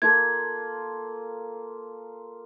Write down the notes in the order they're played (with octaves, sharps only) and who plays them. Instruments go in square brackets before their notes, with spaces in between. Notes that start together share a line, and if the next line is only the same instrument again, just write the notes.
[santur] A#3 F4 A4 [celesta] G#6